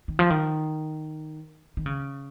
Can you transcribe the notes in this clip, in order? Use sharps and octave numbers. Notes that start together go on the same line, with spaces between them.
D#3
F3
D#3
D#3
C#3